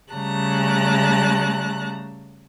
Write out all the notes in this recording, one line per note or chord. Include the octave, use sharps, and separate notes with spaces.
C#3 G3 A3 A5 A#5 F#6